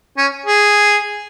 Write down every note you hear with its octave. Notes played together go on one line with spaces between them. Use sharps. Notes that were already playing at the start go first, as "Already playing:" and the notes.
C#4
G#4